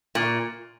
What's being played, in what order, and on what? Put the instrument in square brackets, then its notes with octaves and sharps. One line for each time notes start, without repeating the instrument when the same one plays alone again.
[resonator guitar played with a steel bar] A#2